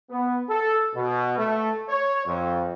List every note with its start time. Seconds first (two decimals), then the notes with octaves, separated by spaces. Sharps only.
0.10 B3
0.49 A4
0.94 B2
1.38 A3
1.89 C#5
2.25 F2